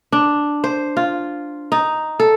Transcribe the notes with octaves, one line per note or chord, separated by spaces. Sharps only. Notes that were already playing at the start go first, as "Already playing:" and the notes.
D4
C5
F4
D#4
A4